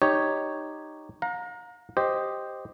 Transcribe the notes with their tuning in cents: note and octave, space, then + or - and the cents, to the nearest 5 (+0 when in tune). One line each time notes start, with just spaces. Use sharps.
D#4 -10 G4 +0 C#5 +0
F5 +45 A#5 +0
G4 +0 C5 +0 D#5 +0